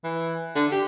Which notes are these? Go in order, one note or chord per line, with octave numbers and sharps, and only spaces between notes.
E3
D3
G4